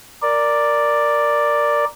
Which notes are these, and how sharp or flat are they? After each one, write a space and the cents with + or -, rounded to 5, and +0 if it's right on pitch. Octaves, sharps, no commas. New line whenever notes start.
A#4 +0 D5 +0